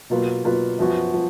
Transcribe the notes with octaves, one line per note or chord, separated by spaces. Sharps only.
B2 F#3 A#3 F4 B4
B2 F#3 A#3 F4 B4
F#2 F3 B3 F#4
F3